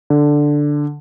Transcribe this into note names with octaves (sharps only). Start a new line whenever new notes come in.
D3